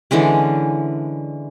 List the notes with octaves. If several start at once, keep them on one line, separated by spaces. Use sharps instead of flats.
D3 E3 G#3 C#4